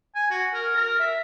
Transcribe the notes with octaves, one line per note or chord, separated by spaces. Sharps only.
G#5
F#4
A#4
A#4
E5